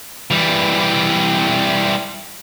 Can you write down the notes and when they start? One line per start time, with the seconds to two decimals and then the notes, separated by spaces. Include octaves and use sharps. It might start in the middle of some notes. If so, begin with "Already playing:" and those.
0.31 E3 G3